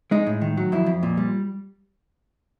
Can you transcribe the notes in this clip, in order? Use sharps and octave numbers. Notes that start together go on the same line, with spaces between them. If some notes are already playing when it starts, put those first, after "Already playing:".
G#3 D#4
A2
D#3
F#3
F2 E4
F2
A#2
G3